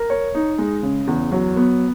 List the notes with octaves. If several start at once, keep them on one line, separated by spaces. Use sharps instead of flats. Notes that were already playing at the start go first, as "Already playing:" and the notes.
Already playing: A#4
C#5
D#4
G#3
C#3
E2
F#3
B3